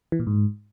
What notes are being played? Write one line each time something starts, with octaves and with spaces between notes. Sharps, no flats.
E3
A#2
G#2